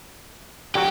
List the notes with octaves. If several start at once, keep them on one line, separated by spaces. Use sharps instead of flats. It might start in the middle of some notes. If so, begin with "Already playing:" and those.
D3 F#3 F#4 G4